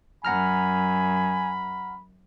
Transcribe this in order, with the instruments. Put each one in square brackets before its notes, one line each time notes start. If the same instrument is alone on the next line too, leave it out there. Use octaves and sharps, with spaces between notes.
[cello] F#2 [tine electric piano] F#5 A#5 F6 [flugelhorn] G#5 [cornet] B5